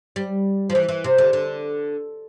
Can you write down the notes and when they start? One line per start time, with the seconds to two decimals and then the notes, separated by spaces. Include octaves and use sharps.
0.16 G3
0.70 F3
0.75 E3
0.89 E3
1.04 C3
1.18 D3
1.33 D3